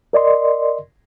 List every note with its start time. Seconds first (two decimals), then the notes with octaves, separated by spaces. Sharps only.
0.13 A#4 D5 D#5 C6